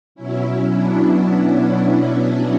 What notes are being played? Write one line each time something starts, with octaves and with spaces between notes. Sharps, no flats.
B2 F#3 C#4 E4
B3 D4
B3 D4
C#4 E4